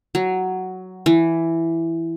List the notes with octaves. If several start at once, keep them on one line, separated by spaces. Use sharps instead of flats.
F#3
E3